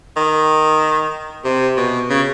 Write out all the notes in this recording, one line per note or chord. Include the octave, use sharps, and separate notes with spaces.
D#3
C3
B2
C#3